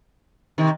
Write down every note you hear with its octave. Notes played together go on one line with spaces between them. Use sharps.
C3 D#3